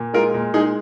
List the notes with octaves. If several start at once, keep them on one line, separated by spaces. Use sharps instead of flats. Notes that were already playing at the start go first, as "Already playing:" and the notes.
Already playing: A#2
G#3 F4 A#4
A#2
G#3 D#4 G#4